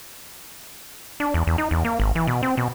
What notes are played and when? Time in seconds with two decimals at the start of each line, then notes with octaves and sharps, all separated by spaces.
1.20 D4
1.34 E2
1.47 E2
1.58 D#4
1.71 E2
1.85 A#3
2.00 G#1
2.15 E3
2.27 B2
2.43 C4
2.57 B2